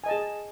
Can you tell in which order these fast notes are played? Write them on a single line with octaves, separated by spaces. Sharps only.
G#5 D#5 A5 G#4